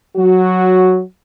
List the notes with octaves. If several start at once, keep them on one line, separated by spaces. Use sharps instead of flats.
F#3 F#4